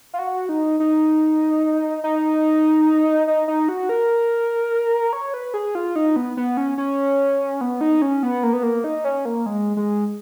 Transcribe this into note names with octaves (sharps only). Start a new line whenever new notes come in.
F4
F#4
D#4
D#4
D#4
D#4
D#4
F#4
A#4
C#5
B4
G#4
F4
D#4
B3
B3
C#4
C#4
B3
D#4
C#4
B3
A#3
B3
A#3
D#4
C#4
A#3
G#3
G#3